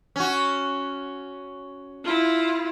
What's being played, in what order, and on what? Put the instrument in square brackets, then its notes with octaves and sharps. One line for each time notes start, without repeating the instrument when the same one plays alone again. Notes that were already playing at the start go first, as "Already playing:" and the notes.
[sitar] C#4 F#4
[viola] E4 F4